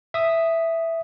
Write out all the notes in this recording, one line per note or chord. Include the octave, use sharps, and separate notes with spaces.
E5 D#6